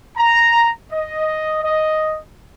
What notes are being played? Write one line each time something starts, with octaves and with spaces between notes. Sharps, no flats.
A#5
D#5
D#5